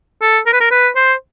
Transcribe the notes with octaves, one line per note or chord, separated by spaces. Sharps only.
A4
A#4
B4
A#4
B4
C5